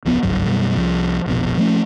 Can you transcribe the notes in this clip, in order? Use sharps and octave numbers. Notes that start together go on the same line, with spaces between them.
D#1 C2 F3 B3
G1 C#2 G#2 F#3
F#2 B2 G3
C2 F3
F1 A#1 F2 B2
F3 A3 C#4